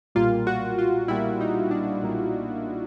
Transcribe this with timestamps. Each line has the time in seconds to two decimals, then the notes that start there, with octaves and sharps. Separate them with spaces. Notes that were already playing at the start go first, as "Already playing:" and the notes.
0.15 B1 A#2 G3 A#3 F4
0.47 F#4
0.78 F4
1.08 B1 A#2 G3 A#3 E4
1.41 D#4
1.71 D4
2.02 B1 A#2 G3 A#3